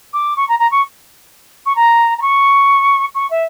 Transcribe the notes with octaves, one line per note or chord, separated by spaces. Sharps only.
D6
C#6
A#5
A#5
C#6
C#6
A#5
A#5
C#6
C#6
E5